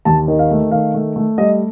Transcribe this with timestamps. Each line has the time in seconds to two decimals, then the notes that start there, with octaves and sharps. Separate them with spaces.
0.05 D#2 A5
0.28 D#3
0.39 F5
0.51 A3
0.71 D#3 F5
0.94 A3
1.16 A3
1.38 G3 D#5